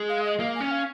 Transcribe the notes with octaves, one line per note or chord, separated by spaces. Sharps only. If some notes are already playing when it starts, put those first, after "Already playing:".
Already playing: G#3
F5
D#5
A#3 F5
G#5
C#4
F5